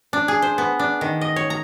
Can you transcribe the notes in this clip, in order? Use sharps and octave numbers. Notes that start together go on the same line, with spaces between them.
D4
G#4
C5
B3
D4
D#3
D#5
C#5
A#5